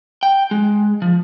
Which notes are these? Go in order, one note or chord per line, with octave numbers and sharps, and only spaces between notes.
G5
G#3
F3